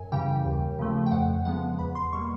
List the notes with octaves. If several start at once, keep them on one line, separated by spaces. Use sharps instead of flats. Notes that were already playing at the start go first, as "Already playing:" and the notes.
Already playing: F#2 G#5
C#3 E3 G3 G5
D#2
C#3 F3 A3
G5
F2 F#5
C#3 F3 G#3 B3 F#5
E2 B5
C6
B2 G3 A#3 C#6